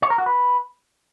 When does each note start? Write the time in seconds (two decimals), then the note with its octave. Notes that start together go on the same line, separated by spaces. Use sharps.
0.02 C#5
0.10 A#4
0.18 F#4
0.26 B4